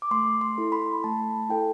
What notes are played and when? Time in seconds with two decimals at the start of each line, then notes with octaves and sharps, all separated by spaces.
0.02 D6
0.11 A3 C6
0.41 C6
0.58 E4 A4
0.72 B5
1.04 A3 A5
1.49 E4 A4 G5